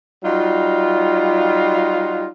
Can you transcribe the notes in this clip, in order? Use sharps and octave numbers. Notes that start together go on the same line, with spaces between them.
F#3 G3 D#4 F4